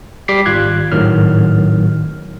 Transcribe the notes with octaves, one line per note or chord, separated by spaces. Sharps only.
G3 D6 B6 C7
G#1 F4 F#6 G#6
G#1 A2 D#3 F#3 F6